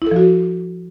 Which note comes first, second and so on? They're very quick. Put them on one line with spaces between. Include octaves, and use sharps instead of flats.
E4 A4 F3 F#4